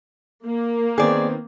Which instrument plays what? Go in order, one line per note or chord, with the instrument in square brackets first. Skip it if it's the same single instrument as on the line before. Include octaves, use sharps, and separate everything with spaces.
[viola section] A#3
[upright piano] D#3 B3 C4 [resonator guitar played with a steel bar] G#4 D5